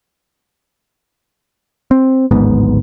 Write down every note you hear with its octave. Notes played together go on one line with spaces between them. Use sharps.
C4
D1 G#1 G#2 B3